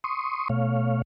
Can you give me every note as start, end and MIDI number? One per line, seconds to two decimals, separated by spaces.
0.04 0.48 84
0.04 0.48 85
0.04 0.48 87
0.49 1.02 47
0.49 1.02 57
0.49 1.02 73
0.49 1.02 77